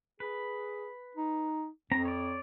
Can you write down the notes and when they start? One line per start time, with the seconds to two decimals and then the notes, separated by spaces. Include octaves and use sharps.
0.20 G#4 B4
1.17 D#4
1.92 F2 C4 A#5
2.05 C#5 D5